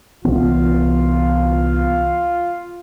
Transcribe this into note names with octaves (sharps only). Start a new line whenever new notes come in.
C2 E3 B3 F4